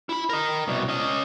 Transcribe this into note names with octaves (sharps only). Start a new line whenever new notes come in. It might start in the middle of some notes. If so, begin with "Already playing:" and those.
E4 B5
A#4 D#5
C2 B2
C#4 D#5